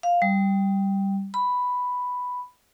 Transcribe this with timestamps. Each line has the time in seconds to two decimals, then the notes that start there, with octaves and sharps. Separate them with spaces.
0.03 F5
0.22 G3
1.34 B5